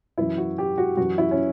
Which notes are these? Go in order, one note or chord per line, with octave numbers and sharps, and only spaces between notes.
F#2 E3 E4
F#4
G4
F#4
F#2 E3 F#4
E4
C#4